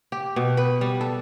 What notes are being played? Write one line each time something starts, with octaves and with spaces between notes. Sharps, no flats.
G4
B2
B4
G3
A4